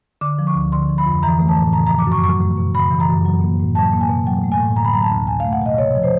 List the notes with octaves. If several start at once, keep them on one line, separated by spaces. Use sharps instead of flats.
D3 D6
F3
C#6
D2
D3 C6
F3
B5
F2
E3 A#5
A3
A5
A2
C#3 A#5
F3 A#5
D6
F#2 C#6
F#3 C#6
A3
B2
C#3 B5
E3
A#5
F#2
F#3
A#3
A2
F#3 A5
A#3
G#5
B2
F#3 G5
A3
G#5
A2
D3 A#5
B5
F#3 A#5
A5
D2
F#3 G#5
A3 F5
F#5
B2 D#5
C3 C#5
F3
C5